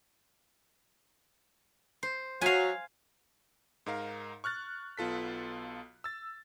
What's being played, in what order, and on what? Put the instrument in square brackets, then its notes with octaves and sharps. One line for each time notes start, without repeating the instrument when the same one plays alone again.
[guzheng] C5
[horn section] F#3 [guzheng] F5 G#5
[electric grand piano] G#2 D#4 A#4 F5
C#6 F6 F#6 A6
B1 B3 F4 A4 B6
E6 A6